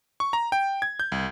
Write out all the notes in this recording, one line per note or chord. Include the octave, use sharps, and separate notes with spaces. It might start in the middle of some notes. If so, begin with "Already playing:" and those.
C#6
A#5
G5
G#6
G6
C2